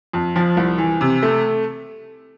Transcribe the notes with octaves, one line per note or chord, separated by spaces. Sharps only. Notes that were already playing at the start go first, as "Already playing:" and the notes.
F2
F3
C2
E3
C3
A3